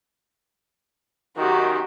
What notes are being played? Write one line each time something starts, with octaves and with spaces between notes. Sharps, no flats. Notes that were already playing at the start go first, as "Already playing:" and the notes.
F#2 D#3 F#4 G4